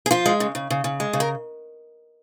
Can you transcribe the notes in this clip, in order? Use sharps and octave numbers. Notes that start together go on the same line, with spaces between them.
G#4
F3 F4
G#3
C#3
C#3
C#3
C#3
G#3
C#3
A#4